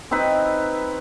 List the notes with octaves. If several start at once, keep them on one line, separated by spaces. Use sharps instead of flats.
C4 D#4 E4 B4